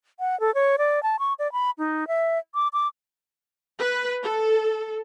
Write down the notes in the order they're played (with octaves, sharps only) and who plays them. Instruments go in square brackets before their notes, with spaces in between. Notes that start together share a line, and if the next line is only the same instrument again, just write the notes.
[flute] F#5
A4
C#5
D5
A5
C#6
D5
B5
D#4
E5
D6
D6
[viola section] B4
A4